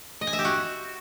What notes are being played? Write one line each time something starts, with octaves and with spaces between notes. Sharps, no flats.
D#5
G#5
E5
G4
F#4